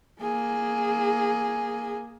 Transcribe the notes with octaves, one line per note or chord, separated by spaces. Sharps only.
A#3 G#4